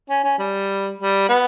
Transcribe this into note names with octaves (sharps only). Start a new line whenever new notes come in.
C#4
C#4
G3
G3
B3